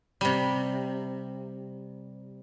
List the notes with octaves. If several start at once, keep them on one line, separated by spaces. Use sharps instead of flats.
C3 G3